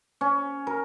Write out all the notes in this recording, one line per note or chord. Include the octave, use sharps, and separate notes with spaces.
C#4
A#4